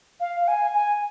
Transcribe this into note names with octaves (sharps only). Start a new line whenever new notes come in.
F5
F5
G#5
G#5